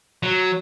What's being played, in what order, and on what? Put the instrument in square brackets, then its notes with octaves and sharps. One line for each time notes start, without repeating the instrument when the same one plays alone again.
[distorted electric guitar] F#3